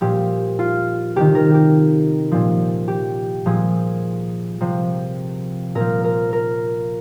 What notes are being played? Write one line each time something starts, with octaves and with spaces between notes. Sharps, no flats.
A#2 F3 G4
F4
C3 D#3 G4
A#4
G4
A#2 F3
G4
A#2 F3 G#4
C3 F3
A#2 F3 A#4
A#4
A#4